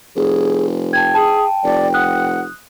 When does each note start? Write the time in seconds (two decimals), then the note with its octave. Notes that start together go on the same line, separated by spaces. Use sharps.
0.16 F1 G#4
0.93 G5 A5 G#6
1.15 G#4 A5
1.64 F1 D5
1.94 F#5 D#6 F#6